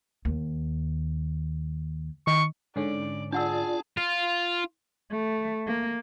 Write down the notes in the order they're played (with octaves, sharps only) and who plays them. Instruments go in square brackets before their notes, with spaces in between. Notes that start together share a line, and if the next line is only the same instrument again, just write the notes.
[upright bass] D#2
[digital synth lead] D#3 [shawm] C#6
[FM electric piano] G#2 D3 C#4 [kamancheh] D5
[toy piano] D4 F#5 E6 [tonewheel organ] F4 D5 [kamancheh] G#4 A5
[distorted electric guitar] F4
[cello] A3
A#3